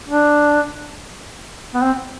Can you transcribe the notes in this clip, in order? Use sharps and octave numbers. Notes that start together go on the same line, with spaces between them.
D4
B3
C4